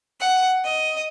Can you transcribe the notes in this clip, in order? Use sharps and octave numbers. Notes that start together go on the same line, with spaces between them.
F#5
D#5